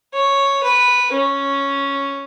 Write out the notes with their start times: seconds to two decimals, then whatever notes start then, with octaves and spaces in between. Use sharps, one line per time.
0.13 C#5
0.63 B4
1.12 C#4